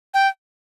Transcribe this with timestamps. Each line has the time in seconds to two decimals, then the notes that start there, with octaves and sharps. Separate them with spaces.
0.14 G5